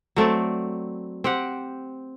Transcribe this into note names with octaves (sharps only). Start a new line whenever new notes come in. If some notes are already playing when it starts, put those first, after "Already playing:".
F#3 A3 C4 D5
C4 G4 F#5